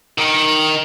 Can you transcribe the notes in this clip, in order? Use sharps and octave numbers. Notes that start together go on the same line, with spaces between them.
D#3